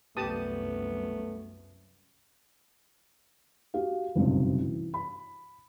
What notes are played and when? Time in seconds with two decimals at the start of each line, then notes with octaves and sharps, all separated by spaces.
0.17 C2 F#2 A3 B3 G4 A5 D#6
3.74 F#4 G4 F5
4.15 F#1 B1 G2 C3
4.61 E3
4.94 B5